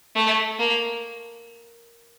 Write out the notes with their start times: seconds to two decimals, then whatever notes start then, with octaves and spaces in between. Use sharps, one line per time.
0.16 A3
0.59 A#3